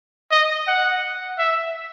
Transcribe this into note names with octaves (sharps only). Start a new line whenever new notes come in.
D#5
F#5
E5